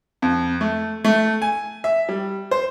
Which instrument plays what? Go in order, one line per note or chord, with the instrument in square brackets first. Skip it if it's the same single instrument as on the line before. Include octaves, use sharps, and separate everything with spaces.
[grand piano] F2
A3
A3
G#5
E5
G3
C5